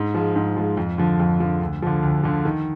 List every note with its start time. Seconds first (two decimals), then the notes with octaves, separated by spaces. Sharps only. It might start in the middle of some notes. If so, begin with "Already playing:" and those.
Already playing: G#2
0.14 F3 G#3
0.36 G#2
0.57 F3 G#3
0.77 F2
0.98 D3 F3
1.20 F2
1.40 D3 F3
1.61 D2
1.82 D3 F3
2.03 D2
2.23 D3 F3
2.45 D#3